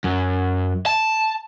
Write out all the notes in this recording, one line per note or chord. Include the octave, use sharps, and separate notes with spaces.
F#2
A5